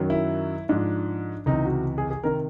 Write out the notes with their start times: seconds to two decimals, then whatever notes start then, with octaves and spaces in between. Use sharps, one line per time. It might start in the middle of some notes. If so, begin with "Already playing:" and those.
Already playing: F#2 D#3 F#3
0.10 E4
0.69 G#2 F3 D4
1.46 C#2 C3 E3 D#4
1.65 F#4
1.98 G#4
2.11 G#4
2.23 C3 D#3 A#4